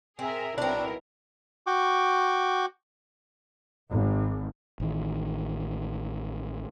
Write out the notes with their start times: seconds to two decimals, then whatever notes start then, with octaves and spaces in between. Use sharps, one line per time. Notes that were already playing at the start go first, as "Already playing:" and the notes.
0.19 C4 G#4 A#4 E5
0.58 B1 C4 D4 E4 A#4
1.67 F#4 G5 C#6 D6
3.90 G#1
4.80 A1 D#3